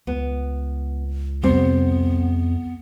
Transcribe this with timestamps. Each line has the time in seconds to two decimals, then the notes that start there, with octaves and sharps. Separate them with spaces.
0.07 C#2 B3
1.44 C2 F2 G3 B3 C4